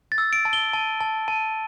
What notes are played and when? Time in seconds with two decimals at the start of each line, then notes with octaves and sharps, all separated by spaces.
0.12 A6
0.18 E6
0.33 D7
0.45 A5
0.53 G7
0.73 A5
1.01 A5
1.28 A5